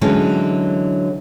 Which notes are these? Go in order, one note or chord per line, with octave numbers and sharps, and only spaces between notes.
D3 E3 F#3 G#3 C#4